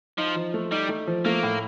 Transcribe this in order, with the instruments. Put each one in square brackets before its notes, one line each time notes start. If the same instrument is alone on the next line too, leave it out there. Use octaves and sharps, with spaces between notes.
[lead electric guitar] F3 [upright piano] D#4
[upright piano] F3
A3
[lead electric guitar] G3 [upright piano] D#4
[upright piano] A3
F3
[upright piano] A3 [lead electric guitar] A#3
[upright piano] A2